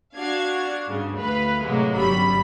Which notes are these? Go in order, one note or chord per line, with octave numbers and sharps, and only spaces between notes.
D4 F#4 F5 G#6
G2 C#3
D2 B4 F5 B5
A2 C3 F#3 G#3 A#3
G1 F#2 G3 B5